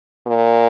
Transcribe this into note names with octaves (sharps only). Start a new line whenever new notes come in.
A#2